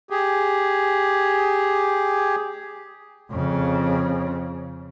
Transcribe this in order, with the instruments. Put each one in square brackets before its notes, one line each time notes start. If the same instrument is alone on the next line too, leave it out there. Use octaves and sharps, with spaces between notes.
[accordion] G4 G#4
[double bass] F2 C#3